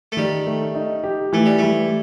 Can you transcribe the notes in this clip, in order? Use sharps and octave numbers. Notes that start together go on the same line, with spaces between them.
A3
D#3 G3
A3
D#4
G4
E3 A3
G3
G3 A3